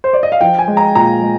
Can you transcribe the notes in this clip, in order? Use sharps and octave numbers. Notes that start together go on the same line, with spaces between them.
C5
D5
D#5
F5
F3 G5
G#5
G#3
A#5
A#2 A#5
G#3